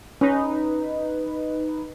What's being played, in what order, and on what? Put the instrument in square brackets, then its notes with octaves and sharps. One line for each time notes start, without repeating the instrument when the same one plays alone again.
[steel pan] C#4 [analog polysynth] D#4 B4